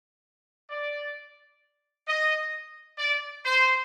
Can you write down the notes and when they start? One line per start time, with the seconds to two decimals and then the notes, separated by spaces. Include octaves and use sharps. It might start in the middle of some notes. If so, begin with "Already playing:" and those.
0.70 D5
2.07 D#5
2.98 D5
3.44 C5